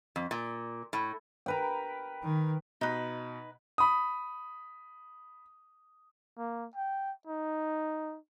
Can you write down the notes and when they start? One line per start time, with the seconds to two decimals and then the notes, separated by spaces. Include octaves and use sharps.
0.16 F2
0.31 A#2
0.93 A2
1.46 A#4 B4 G5
2.24 D#3
2.81 B2 D#4 B4
3.78 B5 D#6
6.38 A#3
6.75 G5
7.27 D#4